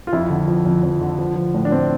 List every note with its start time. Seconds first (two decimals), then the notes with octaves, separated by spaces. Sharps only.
0.07 F4
0.13 F2 E4
0.30 D3
0.48 F3
0.66 F2
0.83 F2
1.01 D3
1.19 F3
1.36 F3
1.54 A2
1.65 D4
1.71 A2 C4